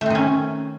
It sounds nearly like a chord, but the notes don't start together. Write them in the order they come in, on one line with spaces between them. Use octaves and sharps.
A3 C4 D#3 C#4